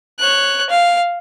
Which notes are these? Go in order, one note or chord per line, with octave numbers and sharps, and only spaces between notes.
C#5 F#6
F5